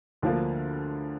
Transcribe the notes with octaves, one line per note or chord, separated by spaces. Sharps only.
D2 D3 F3 A#3